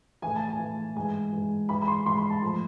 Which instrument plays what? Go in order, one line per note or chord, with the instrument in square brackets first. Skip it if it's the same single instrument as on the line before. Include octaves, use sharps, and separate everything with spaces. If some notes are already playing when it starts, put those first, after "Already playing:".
[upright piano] A2 E3 G#5
A5
G#5
A2 E3
G#2 E3 G#5
G#2 E3
G#2 E3 B5
B5
C6
G#2 E3 C6
B5
A5
A2 F3 B5